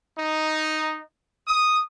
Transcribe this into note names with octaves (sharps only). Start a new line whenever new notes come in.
D#4
D#6